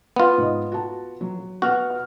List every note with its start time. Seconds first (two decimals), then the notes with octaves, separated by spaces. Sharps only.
0.16 B3 F4
0.38 G#2 D#5
0.72 F#4 A5
1.21 F#3
1.62 B3 F#4 F#5 F6